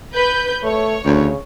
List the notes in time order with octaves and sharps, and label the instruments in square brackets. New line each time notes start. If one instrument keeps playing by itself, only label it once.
[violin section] B4 G6
[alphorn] A3 [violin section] C#5
[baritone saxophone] D2 [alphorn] C#3